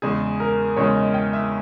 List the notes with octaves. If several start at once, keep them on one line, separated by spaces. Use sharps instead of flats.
E2 C#3 G#3 G#4
A#4
E2 C#3 G#3 C#5
D#5
G5
E5